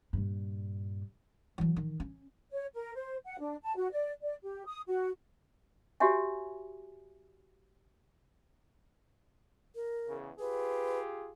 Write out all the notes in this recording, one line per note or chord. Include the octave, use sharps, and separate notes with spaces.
G2 A#2
E3 F#3
D#3
C#4
C#5
A#4
C5
F#5
D4
A5
F#4
D5
D5
G4
D#6
F#4
F#4 G4 C#5 E5 G#5
A#4
E2 C#3
F4 G4 G#4 B4